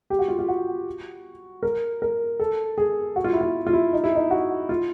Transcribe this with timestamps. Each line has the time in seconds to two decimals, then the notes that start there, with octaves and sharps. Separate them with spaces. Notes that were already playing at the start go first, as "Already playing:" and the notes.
0.10 G4
0.19 F#4
0.28 F4
0.39 F4
0.48 F#4
1.63 A#4
2.02 A#4
2.40 A4
2.78 G#4
3.16 F#4
3.24 F4
3.33 E4
3.41 F4
3.67 F4
3.73 E4
3.93 D#4
4.04 E4
4.15 D#4
4.31 F#4
4.69 F4